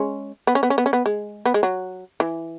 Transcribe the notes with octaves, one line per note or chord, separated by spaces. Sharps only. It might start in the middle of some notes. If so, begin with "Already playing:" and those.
Already playing: G#3 C#4
B3
C#4
B3
C#4
B3
C#4
B3
G#3
B3
G#3
F#3
E3